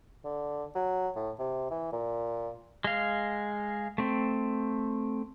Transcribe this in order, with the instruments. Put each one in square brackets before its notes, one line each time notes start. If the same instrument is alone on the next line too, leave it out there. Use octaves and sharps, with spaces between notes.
[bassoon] D3
F#3
A2
C3
E3
A#2
[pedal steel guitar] G#3 F5
A3 C4